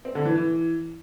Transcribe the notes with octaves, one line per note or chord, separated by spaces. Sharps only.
C4
D3
E3
E3